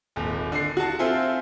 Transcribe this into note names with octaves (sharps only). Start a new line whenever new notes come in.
D#1 G#1
D3 C7
F#4 A5
C4 F4 A4 C5 E5 G#5